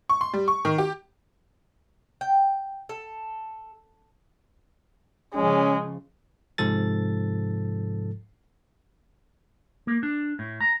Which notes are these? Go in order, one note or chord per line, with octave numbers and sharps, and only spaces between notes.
C#6
C6
G3
C#6
D#3
G4
G5
A4
C#3 F3 G#3 C#4
G#2 C3 F3 A4 A6
A#3
D4
A2
A#5